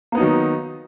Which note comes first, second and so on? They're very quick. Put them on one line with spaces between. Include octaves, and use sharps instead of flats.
A#3 B3 D#4 F#3 D#3